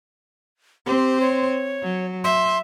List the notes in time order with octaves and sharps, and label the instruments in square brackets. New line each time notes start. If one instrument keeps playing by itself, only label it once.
[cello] C4 C5 [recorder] G4
[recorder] C#5
[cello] F#3
[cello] E5 [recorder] C6